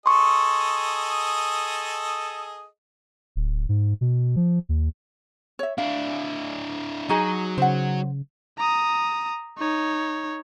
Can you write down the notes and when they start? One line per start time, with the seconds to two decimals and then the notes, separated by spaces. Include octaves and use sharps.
0.06 G#4 A4 D#5 C6 C#6
3.36 D1
3.69 G#2
4.01 B2
4.36 F3
4.69 D#2
5.59 C#5 E5
5.78 D4 E4 F5
7.09 F#3 D#4 F#4 G#4
7.58 C#3 C5 F#5
8.59 A#5 D#6
9.58 D#4 C#5